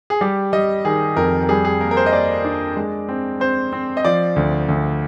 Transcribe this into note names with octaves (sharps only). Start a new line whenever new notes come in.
G#4
G3 G4
G3 D#5
D#3 G#4
F2 A#4
A#4
G3 G#4
G#4
A#3 A#4
A#4
C5
D#5
A#3 D5
D4
G#3
C4
C4 C5
C4
D#5
F3 D5
D2
D2